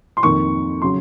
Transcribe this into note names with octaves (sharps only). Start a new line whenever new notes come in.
C6
F2 D#3 A#3 C#6
C#3 F#3 C6